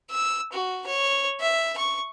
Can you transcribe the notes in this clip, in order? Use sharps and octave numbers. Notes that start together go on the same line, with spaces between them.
E6
F#4
C#5
E5
C#6